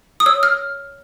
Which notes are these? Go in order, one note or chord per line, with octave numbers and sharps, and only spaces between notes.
D#6
C#5 E6
F6